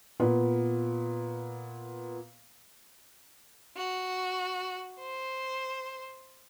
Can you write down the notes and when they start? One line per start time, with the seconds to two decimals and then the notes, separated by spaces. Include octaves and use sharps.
0.20 A#2 B3
3.77 F#4
5.00 C5